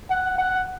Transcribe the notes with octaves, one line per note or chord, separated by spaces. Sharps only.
F#5
F#5